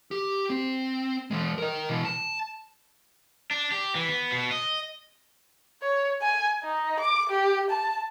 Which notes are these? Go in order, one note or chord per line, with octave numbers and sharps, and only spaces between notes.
G4
C4
E3 G#3
A#4 D#5
B2 E3
A5
D4
G4
E3
B3
B2
D#5
C#5
G#5
D#4
D6
G4
A5